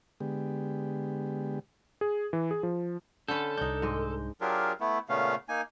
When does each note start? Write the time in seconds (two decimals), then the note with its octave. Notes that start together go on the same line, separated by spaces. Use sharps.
0.21 D3 G#3 B3 G4
2.01 G#4
2.33 E3
2.51 G#4
2.63 F3
3.28 D3 C#4 A4 B5 G6
3.58 C2 D4 D#4 G6
3.82 G#2 G#3
4.41 F#3 D4 F4 G4 G#4 A#4
4.81 A3 B3 E4
5.09 A#2 C#3 A3 B3 C#4 F5
5.49 A#3 D#4 G#5